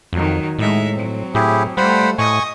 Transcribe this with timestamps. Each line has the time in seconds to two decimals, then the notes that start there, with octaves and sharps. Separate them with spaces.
0.13 F2 D#3 F#3
0.59 A2 G#3 D#4 E5
0.95 F#3 C4
1.35 A2 E4 G4 G#4
1.77 G3 A3 F4 C5 F#5 B5
2.19 A2 D#5 G#5 C#6 D#6